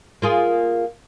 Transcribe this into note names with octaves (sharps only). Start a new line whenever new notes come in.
A#3 F4 G#4